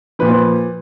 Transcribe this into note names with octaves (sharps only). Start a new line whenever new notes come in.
A#2 F3 B4